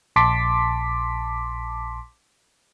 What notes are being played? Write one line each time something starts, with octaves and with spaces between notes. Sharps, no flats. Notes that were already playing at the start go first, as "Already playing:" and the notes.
A#1 A5 C6 D6 B6